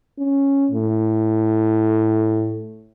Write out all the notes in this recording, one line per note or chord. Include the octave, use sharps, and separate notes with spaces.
C#4
A2